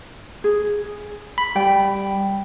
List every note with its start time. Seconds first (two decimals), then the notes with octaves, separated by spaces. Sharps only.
0.44 G#4
1.38 B5
1.56 G3 G5